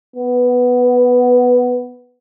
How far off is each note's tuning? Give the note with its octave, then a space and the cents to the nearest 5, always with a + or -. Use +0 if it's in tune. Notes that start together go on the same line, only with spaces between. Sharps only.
B3 +0